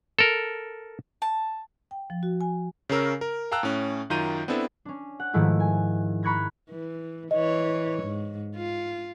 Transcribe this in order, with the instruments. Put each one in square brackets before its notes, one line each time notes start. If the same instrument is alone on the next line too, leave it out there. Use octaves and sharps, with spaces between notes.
[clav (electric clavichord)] A4 A#4
[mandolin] A5
[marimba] G5
F3
F#4
G#5
[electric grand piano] C#3 C#4 A#4 E6
A#4
F5 G5 A5 A#5 E6 F#6
A2 C#4
F#2 D#3 F4 A#5 G6 D#7
B3 C4 D4 E4 A4
[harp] C#4 D4
F#5
G#2 D#3 F3 A3 E4
G#5
A#5 B5 C#6 F#6 G#6 A#6
[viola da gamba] E3
[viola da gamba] E3 C#5 [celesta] D#5
[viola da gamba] G#2
F4